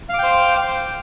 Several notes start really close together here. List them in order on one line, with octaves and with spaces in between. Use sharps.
F5 D6 G5 C5